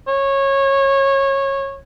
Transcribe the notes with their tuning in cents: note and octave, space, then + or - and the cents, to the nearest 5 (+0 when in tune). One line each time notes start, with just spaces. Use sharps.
C#5 -20